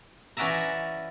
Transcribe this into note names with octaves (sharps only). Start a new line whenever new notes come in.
E3 C#4 F#4 D5 E5 A#5